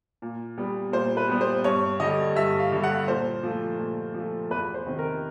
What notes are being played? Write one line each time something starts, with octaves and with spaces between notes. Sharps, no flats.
A#2
G3 B3
A#2 C5
B4
G3 B3
C5
G2 C#5
D3 G3 D#5
G2 E5
F5
D3 G3
F#5
A#2 C5
F3 A3
A#2
F3
A3
E2 B4
C5
C3 D#3
A#4